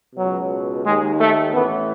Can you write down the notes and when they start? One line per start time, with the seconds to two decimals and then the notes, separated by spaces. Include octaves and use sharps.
0.15 C#2 B2 F#3
0.84 D#2 D#3 G#3
1.19 A3
1.53 A1 A2 E3 B3